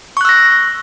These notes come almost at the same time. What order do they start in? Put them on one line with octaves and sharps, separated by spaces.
C#6 F#6 E6 A#6